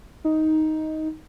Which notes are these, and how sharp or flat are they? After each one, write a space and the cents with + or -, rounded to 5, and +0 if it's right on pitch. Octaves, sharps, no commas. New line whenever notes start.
D#4 +10